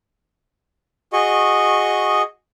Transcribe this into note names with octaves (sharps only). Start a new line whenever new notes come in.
F#4 G#4 D#5 C#6